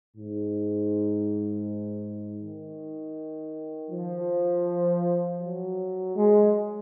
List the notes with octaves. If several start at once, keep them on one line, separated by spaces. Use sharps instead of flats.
G#2
D#3
F3
F#3
G#3